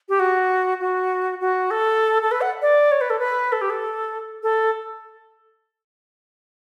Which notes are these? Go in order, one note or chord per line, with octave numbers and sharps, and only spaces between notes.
G4
F#4
F#4
F#4
A4
A4
B4
F#5
D5
C#5
B4
A4
B4
A4
G4
A4
A4